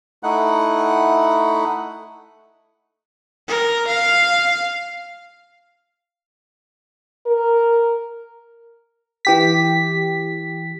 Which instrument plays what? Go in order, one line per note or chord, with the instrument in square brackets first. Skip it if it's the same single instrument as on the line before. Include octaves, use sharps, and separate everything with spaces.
[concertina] A3 D#4 E4 F#5
[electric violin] A#4
F5
[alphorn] A#4
[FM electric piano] E3 G4 B6